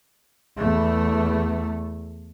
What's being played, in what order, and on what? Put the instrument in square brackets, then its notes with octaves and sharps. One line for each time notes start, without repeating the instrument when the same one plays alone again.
[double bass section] E2 A3